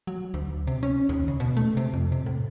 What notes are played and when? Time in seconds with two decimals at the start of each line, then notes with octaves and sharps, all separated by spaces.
0.07 F#3
0.34 D2
0.67 C3
0.83 C#4
1.09 D#2
1.28 C#3
1.40 B2
1.57 A3
1.77 C3
1.93 F2
2.12 C3
2.26 A2